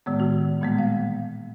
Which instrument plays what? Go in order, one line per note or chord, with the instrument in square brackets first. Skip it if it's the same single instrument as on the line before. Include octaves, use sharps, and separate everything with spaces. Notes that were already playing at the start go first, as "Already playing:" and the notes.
[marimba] A2 D#3 G#3 B3
F#4
A#2 E3 G3 G#3 A#3 B3
F5